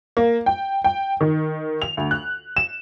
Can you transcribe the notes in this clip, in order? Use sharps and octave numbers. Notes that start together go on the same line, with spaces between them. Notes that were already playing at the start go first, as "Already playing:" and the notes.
A#3
G5
G5
D#3
F7
D2
F#6
E7